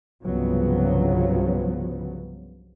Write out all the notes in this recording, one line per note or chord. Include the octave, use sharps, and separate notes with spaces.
C2 G2 C#3 F3 F#3 B3